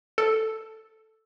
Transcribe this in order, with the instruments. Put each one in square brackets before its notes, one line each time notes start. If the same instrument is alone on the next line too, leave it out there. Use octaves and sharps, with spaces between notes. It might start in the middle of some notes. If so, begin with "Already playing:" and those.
[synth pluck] A4